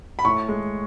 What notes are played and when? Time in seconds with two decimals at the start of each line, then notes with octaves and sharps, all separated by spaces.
0.19 B5
0.25 A2 C#6
0.48 G#3